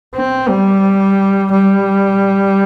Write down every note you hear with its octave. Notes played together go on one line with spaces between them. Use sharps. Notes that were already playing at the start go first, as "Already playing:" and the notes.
C4
G3
G3